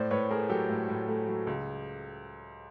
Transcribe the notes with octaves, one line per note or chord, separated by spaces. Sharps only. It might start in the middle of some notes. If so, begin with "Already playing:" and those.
Already playing: A2 C5 D5
A2 B4 C#5
A3 G#4 A#4
F#3 G4 A4
A2
A2
A3
F#3
C#2